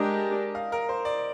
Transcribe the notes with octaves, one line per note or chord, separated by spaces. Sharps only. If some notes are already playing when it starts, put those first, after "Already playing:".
Already playing: G#3 D4 G4 A#4 D#5
F5
A#4
C5
D5